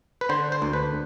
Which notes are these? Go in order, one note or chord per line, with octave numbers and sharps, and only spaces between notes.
B4
D3 C5
C5
D2
B4